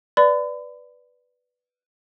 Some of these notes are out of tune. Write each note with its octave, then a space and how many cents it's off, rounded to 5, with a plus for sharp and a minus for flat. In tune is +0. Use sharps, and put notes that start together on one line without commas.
B4 +0 D5 +0 B5 +40